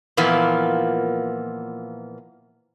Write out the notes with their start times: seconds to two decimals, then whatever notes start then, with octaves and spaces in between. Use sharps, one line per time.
0.17 A#2 E3 F3 A#3 B3